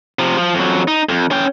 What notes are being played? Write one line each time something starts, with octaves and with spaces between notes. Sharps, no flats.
C3 F3
F3
F2 F#3
D#4
F2
C#4 G5